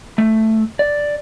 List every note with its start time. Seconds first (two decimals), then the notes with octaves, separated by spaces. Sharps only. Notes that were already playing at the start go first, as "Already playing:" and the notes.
0.18 A3
0.79 D5